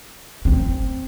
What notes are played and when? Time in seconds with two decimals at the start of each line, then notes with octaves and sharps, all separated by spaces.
0.45 C4